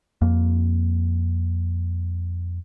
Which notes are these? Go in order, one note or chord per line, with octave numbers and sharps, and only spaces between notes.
F2 A#3